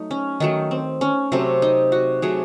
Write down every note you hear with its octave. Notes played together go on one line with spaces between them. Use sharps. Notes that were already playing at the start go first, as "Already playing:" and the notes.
Already playing: F#3 A3 D#4
C#4
D#3 F#3 A3 D#4
C4
C#4
C3 F#3 A3 C4
D#4
F#4
C3 F#3 A3 G#4